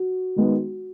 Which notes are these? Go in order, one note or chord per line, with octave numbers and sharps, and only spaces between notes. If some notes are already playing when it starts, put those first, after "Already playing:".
Already playing: F#4
D#3 G#3 B3